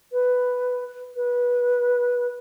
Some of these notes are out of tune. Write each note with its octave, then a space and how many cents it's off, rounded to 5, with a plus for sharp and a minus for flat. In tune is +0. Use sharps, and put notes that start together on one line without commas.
B4 +5
B4 -20